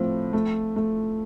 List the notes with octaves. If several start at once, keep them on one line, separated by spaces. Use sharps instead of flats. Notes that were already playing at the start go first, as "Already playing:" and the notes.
Already playing: A2 F3 C4
A3
A3